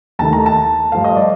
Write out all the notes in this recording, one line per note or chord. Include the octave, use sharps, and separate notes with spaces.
D#2 D#3 A3 A5
A#5
A5
G2 F3 A3 F5
D#5
D5